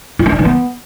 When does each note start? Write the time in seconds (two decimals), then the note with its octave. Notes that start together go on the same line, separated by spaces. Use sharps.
0.19 F4
0.26 C#4
0.32 D4
0.39 E3
0.45 B3